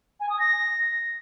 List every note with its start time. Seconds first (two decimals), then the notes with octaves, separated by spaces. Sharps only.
0.20 G#5
0.29 D#6
0.39 A#6